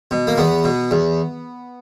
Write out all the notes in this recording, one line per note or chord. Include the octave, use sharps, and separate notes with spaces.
B2
A#3
E2 B3
B2
E2